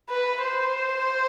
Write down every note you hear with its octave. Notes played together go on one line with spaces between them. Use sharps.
B4
C5